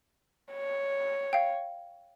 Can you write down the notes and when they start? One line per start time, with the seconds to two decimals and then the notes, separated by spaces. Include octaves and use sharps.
0.53 C#5
1.33 F5 G5